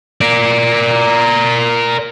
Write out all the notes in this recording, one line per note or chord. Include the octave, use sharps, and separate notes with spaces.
A#4 D5